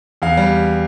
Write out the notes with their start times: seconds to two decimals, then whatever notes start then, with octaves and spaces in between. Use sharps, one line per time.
0.22 E2 F5
0.37 G3